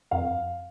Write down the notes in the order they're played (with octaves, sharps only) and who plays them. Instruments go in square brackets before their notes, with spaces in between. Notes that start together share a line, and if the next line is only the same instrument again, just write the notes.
[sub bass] F2 [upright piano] F5